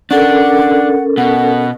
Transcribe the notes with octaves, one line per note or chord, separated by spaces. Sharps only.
C#4 D4 A4 A#4 F#5
B2 F#5